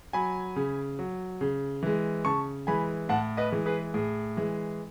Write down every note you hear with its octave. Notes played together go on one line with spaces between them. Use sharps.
F#3 G#5 B5
C#3
F#3
C#3
E3 G#3
C#3 A5 C#6
E3 G#3 G#5 B5
A2 F#5 A5
B4 D#5
E3 G#3
G#4 B4
A2 G#4
E3 G#3